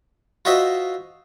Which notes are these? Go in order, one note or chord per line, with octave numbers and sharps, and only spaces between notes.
F4 F#4 C5 D#5 E5